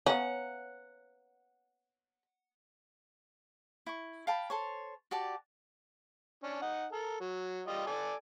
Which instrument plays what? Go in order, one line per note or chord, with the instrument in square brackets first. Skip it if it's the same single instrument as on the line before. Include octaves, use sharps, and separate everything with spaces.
[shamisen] B3 C#4 [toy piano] C#5 F5 A#5 [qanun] F#5
[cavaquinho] E4 C#6
F5 G5 A5 B5
A4 C5 C#5
F#4 G4 D5 A5
[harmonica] C#4 D4
D#4 F#5
A4 A#4
F#3
G3 F4 D#5
A4 D5 G#5